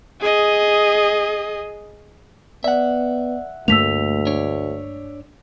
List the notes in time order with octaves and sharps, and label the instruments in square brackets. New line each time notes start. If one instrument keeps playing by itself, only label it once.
[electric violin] G#4 D#5
[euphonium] B3 [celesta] D5 [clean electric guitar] E5 F#5
[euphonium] D2 [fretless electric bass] G2 A3 A#3 [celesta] E6 B6 F7
[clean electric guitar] D4 C#5